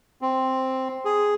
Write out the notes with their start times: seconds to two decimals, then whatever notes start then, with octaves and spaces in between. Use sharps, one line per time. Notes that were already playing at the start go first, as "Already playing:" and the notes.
0.22 C4
1.05 G#4